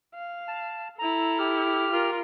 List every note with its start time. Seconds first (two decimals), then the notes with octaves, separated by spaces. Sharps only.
0.15 F5
0.48 A5
0.99 E4 A4 A#5
1.38 G4 F6
1.91 F4 A#4